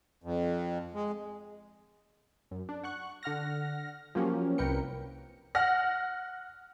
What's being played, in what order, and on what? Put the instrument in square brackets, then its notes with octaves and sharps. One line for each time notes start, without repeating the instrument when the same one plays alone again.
[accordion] F2
G#3
[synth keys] F#2
D4
F#5 C#6 F#6
D3 F#5 F6 A#6
F3 F#3 A#3 C#4 G4
C2 C3 A#4 B4 G5 C#7
[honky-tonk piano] F#5 F6 A#6